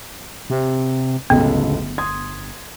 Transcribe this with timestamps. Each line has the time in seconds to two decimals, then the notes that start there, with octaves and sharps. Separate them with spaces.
0.50 C3
1.30 D1 G1 C#2 B3 A4
1.98 C6 D#6 G#6